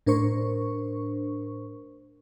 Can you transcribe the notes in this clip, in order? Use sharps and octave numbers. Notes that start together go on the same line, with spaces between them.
A2 D4 A#4 C5 C#6